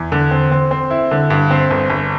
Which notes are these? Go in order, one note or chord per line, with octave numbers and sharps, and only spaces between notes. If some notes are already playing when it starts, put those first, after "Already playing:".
Already playing: E2
D3
C4
C4
C4
E4
D3
G2
C4
G1
G1